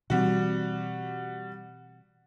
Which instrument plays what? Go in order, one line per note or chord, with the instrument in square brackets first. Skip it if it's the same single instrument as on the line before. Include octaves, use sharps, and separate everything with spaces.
[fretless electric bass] B2 E3 C4 [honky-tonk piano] G3 F#4